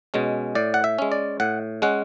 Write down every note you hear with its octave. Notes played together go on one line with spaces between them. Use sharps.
B2 G#3 C#4
A2 D5
F#5
E5
G#3 C#4
D5
A2 F#5
G#3 C#4 F#5